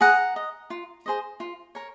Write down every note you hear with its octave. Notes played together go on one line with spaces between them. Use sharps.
G#4 F#5 A#5
D#5
F4
G#4 C5 D#5
F4
A#4 C#5